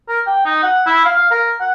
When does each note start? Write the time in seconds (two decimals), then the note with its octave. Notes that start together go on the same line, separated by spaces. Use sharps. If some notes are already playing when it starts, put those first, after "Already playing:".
0.08 A#4
0.26 G5
0.45 D#4
0.63 F#5
0.86 E4
1.05 F5
1.16 F5
1.31 A#4
1.60 F#5